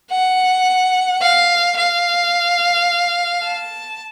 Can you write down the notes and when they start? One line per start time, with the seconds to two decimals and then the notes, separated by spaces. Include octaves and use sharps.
0.11 F#5
1.22 F5
1.77 F5
3.43 A5